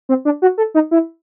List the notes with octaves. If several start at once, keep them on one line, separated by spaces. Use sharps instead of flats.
C4
D4
F#4
A4
D#4
E4